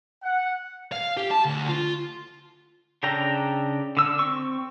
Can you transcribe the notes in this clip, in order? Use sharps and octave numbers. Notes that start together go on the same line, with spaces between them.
F#5
F5
G4
A5
D2
F4
C#3 D4 A4 G5 A#5
D3 E6
C4 C#6